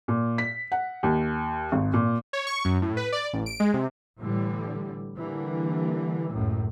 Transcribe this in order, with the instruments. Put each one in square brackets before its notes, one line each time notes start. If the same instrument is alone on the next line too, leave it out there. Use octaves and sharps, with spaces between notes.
[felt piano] A#2
B6
F#5
D#2
G#1
A#2
[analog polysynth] C#5
C#6
F#2
A2
B4
D5
A1
D7
G#3
C3
[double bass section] A2 D3 E3 G3
D3 E3 G3 A#3
C#2 F#2 A2